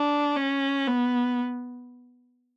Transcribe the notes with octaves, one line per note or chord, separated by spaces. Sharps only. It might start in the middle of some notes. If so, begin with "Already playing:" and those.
Already playing: D4
C#4
B3